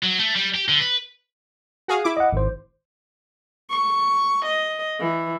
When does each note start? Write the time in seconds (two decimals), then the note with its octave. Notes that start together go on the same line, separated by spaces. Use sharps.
0.03 F#3
0.19 A3
0.36 G3
0.55 G4
0.68 D3
0.80 B4
1.88 F#4 G#4 F5
2.04 E4 D6
2.17 D#5 F#5
2.33 G#1 C5
3.70 C#6
4.45 D#5
5.00 E3